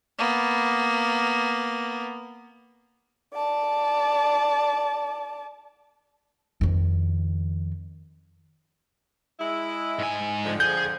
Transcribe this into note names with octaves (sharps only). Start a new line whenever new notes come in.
A#3 B3
D5 A5
F2 D#3
G#3 E4
G#2 G#5
F2 D3 F3
G#4 G6